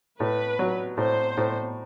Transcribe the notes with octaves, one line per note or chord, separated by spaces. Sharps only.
A2 B4
F#3
A2 C5
A2